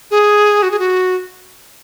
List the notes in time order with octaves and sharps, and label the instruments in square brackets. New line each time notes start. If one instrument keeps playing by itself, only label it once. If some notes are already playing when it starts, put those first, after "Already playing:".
[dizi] G#4
F#4
G#4
F#4